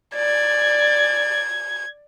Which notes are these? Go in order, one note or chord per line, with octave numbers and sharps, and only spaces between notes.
D5 G#6